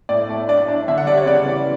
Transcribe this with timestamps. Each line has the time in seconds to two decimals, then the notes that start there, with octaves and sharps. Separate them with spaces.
0.09 A2 D5
0.29 A3
0.48 D4 D5
0.68 D4
0.88 D3 E5
0.98 F#5
1.06 G3 D5
1.17 C#5
1.26 C#3 D5
1.46 E3